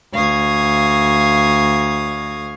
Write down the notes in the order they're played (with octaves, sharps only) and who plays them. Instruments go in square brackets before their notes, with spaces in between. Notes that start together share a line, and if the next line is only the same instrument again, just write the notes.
[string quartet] D2 F5 C#6 D#6 G#6